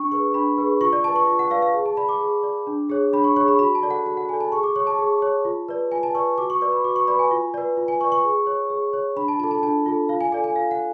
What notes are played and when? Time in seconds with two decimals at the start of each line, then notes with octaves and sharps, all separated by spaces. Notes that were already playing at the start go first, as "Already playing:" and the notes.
Already playing: D4 C#6
0.11 G#4 B4 C#6
0.34 D4 B5
0.58 G#4 B4
0.81 F4 C#6
0.93 D5
1.04 D5 A5
1.08 B4
1.16 C#6
1.27 F4
1.39 F#5
1.50 B4 D5 F5
1.62 F5
1.74 G#4
1.86 A5
1.97 D5 B5
2.09 D6
2.20 G#4
2.43 D5
2.67 D4
2.90 G#4 C#5
3.13 D4 B5
3.24 C#6
3.36 G#4 C#5 C#6
3.48 B5
3.59 F#4 B5
3.75 A5
3.83 A4 D5
3.91 F#5
4.06 F#4 F#5
4.17 F#5
4.29 A4 D5 G#5
4.41 A5
4.52 G#4 C#6
4.63 D6
4.76 C#5 C#6
4.87 A5
4.99 G#4
5.22 C#5
5.45 F4
5.69 B4 D5
5.92 F4 G#5
6.03 A5
6.15 B4 D5 C#6
6.38 F#4 D6
6.50 C#6
6.61 B4 D5 C#6
6.73 B5
6.84 F#4 D6
6.96 C#6
7.08 B4 D5 B5
7.19 G#5
7.31 F4
7.54 B4 D5
7.77 F4
7.88 G#5
8.00 B4 C#6
8.04 D5
8.12 C#6
8.24 G#4
8.47 C#5
8.70 G#4
8.93 C#5
9.16 D4 B5
9.28 A5
9.39 F4 A5
9.44 A4
9.51 A5
9.62 D4 A5
9.86 F4 A4
10.09 F4 F5
10.21 G#5
10.32 A4 D5 G#5
10.44 G#5
10.55 F4 F5
10.71 F#5